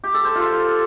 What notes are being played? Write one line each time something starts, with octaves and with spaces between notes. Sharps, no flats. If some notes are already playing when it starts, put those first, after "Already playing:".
G4
A4
C5
F4